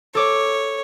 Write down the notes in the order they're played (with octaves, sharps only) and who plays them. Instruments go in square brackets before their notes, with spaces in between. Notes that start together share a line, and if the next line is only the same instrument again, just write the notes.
[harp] A4 D6 [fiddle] C#5